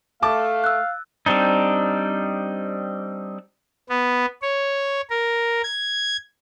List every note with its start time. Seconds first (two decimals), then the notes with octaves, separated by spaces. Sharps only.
0.22 A3 F5 A5 D6 A6
0.64 E6 F#6
1.26 G3 C4 D4 D#4
3.89 B3
4.42 C#5
5.10 A#4
5.63 G#6